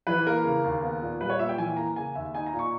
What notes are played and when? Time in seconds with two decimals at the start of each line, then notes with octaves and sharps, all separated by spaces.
0.07 E3 B4
0.27 A#3 A#4
0.45 C#3
0.64 D#2
0.82 B3
1.02 A#2
1.21 G3 B4
1.30 C#5
1.39 A#2 E5
1.49 G5
1.58 E3 G#5
1.77 A#3 A#5
1.96 C#3 G#5
2.15 D#2 E5
2.35 D#4 G#5
2.47 A#5
2.53 A#2
2.59 C#6